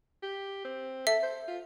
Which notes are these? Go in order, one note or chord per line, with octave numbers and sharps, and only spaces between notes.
G4
C4
A4 E5
C5
F4